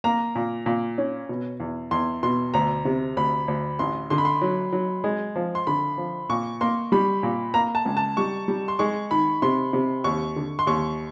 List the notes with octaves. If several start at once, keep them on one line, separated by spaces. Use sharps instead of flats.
A#3 A#5
A#2
A#2
C#4
B2
E2
E2 C6
B2 C6
D2 A#5
C3
D2 B5
D2
A1 C6
D3 C6
B5
C6
F#3
F#3
G#3
F3
C6
D3 B5
F3
A#2 C#6
A#3 C6
G3 B5
A#2
A#3 A#5
A5
C#2
A5
G3 C#6
G3
C6
G#3 C#6
D#3 B5
C3 C6
C3
D#2 C#6
D3
C6
D#2 C#6